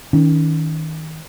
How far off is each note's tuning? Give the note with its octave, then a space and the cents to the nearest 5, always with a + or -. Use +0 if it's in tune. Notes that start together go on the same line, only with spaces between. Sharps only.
D#3 +25 C#4 +35